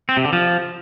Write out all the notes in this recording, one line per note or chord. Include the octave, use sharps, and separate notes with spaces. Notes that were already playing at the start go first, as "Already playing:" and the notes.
C4
C3
D3
F3